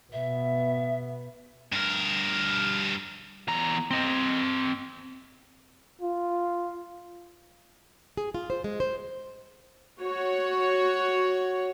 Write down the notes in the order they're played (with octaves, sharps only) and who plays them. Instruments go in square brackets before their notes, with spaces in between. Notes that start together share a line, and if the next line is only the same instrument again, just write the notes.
[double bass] B2 B3 [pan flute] E5
[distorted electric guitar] G2 A#4
E2 A#5
C4 D#5
[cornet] F4
[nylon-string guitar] G#4
F4
C5
G#3
C5
[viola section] F#4 C#5